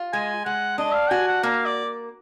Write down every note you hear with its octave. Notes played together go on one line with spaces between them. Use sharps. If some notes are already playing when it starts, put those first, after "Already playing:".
Already playing: F4
G#3 G#5
G#3 F#5
D4 D#5
F5
F#4 G#5
F#5
A#3 F5
D5